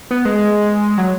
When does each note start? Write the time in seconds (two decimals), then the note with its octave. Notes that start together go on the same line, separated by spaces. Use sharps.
0.11 B3
0.25 G#3
0.98 F#3